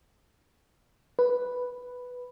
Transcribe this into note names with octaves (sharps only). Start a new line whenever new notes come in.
B4